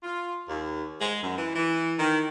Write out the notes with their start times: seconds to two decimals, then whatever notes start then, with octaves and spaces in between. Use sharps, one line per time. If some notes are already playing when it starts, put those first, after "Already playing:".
0.03 F4
0.49 D#2
0.99 G#3
1.22 F#2
1.36 E3
1.56 E3
1.99 D#3